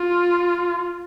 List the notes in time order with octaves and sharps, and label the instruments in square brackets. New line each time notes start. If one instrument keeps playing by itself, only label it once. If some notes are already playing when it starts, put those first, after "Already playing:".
Already playing: [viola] F4